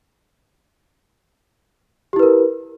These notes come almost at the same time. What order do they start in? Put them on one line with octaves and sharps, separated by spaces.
G4 E4 B4 A#4